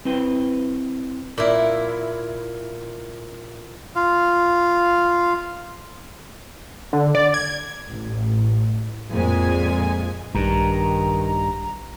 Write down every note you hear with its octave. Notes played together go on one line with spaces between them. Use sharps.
C4 E4 B4 G5
A#2 E4
F4 F5
D3
D5
G#6
A1
F2 A#2 G#3 G#5
A#1 G2 D#3 A#5